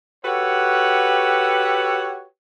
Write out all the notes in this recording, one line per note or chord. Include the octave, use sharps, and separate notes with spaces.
F#4 G4 A4 B4 C#5 F#5